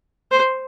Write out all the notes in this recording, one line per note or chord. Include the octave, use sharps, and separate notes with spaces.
C5